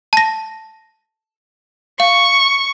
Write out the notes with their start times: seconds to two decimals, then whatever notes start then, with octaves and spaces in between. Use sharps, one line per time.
0.13 A5 A#6
2.00 F5 C#6